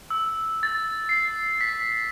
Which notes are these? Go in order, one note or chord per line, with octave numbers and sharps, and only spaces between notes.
E6
A6
C7
B6